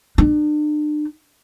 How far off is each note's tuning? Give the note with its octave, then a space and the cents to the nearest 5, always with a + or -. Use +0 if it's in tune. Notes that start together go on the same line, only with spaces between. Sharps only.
D4 +40